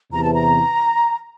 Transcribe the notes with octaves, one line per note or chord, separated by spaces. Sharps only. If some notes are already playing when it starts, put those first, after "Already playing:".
E2 C3 E3 A#5
A5
A#5